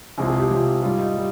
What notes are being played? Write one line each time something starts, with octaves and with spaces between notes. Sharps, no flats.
C2 C3 F3 G#3 G#4
G#4
G4
C2 C3 F3 G#3 F4
G#2 G3 F4
D#4
G3